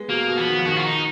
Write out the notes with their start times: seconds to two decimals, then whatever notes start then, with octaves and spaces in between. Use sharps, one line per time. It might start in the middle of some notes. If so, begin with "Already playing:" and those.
Already playing: G#3 B3
0.09 B2 A#3
0.28 B2
0.37 F3 B3
0.47 D#3
0.59 F3
0.66 D#3 F#4
0.77 F4
0.84 D#4